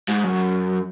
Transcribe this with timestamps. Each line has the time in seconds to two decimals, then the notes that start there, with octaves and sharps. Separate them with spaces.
0.08 G#2
0.24 F#2